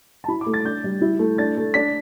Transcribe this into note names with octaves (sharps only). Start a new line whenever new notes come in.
A5
E4 B5
D6
A3
A6
D4 G6
G3
E4
A3
D4 A6
A3
D4 B6